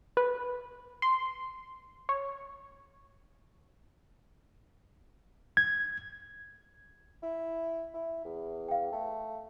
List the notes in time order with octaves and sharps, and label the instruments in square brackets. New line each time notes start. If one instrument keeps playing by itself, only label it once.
[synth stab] B4
C6
C#5
[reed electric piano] G#6
[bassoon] E4
E4
E2
[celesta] F5 G5
[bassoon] A3